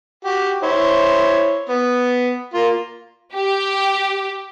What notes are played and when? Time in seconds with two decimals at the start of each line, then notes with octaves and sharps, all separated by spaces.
0.25 F#4 G4
0.63 E4 C5 C#5
1.69 B3
2.53 A#3 F4
3.33 G4